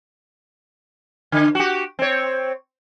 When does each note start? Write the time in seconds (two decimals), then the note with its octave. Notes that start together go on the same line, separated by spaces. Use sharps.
1.32 D3
1.55 F#4 G4
1.99 C4 C#5